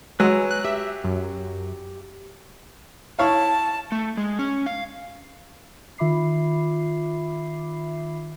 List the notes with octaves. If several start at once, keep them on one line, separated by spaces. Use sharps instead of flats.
F#3 G#3 B4 G#5 E6
F#6
G4 E5
F#2
E4 C#5 F5 A5
A3
G#3
C#4
F5
D#3 F4 E5 B5 D6 C7